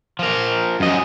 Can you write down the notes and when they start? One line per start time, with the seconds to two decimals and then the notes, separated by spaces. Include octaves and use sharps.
0.19 F3 A#4
0.80 F#2 D#5